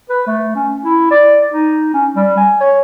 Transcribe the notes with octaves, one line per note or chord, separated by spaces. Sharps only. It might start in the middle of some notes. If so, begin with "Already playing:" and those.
B4
A3
C#4
E4
D5
D#4
C#4
G3
G#5
C#5